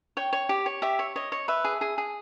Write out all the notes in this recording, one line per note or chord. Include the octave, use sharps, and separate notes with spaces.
C#5 G5
C#5
G4
C#5
G4 E5
C#5
C#5 D#5
C#5
B4 E5
G#4
G#4
G#4